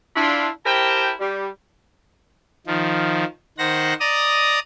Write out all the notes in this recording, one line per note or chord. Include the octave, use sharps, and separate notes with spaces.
D4 E4 F4
E4 G4 A#4 C5 G5 A5
G3
D#3 F3
D#3 C5 F#5 A#6
D5 D#5 A#5 D#6